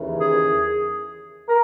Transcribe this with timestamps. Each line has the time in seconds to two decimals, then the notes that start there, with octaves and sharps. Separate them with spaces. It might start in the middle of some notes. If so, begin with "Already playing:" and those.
Already playing: D#2 C#3 E3
0.19 G#4
1.48 A#4